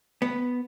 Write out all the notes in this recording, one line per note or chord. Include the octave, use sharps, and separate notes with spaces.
B3